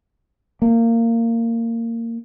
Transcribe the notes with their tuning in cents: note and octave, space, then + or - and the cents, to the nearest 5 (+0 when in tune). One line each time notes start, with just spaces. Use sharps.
A#3 -20